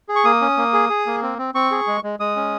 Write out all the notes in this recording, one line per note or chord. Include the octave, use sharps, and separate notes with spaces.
G#4
C#6
A#3 D#6
C#4
A#3
G#4
G#4
A#3
C4
C4
C4 C#6
G#4
G#3
G#3
G#3 D#6
C#4